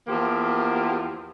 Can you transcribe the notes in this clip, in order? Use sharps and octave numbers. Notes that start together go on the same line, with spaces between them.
E2 F3 A#3 G4